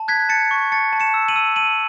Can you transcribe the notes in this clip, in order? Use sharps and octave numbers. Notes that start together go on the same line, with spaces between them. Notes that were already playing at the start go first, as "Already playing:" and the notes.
Already playing: A5
F#6 G#6 B6
A5 A6 C#7
C#6
A5 A6 C#7
A5
C#7 E7
E6
D#7 F#7
E6
A5 D#7 F#7